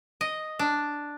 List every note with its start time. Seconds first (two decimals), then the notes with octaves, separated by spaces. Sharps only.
0.21 D#5
0.59 D4